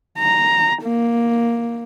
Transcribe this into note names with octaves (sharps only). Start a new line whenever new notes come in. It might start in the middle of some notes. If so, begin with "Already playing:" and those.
A#5
A#3